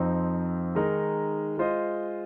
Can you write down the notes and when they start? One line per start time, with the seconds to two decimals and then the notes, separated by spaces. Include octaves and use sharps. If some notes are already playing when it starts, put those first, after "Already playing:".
Already playing: F2 F3 C4 D#4
0.75 D#3 G#3 D#4 A#4
1.58 G#3 F4 C5 D#5